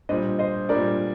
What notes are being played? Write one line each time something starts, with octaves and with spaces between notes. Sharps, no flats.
A#2 G3 D4 C5 D#5
C5 D#5
A#2 G3 D4 A#4 D5